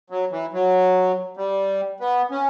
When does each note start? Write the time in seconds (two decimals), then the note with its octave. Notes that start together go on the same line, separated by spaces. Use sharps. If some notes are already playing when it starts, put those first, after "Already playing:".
0.10 F#3
0.31 E3
0.53 F#3
1.37 G3
2.00 B3
2.31 C#4